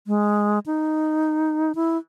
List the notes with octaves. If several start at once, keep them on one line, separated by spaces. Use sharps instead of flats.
G#3
D#4
E4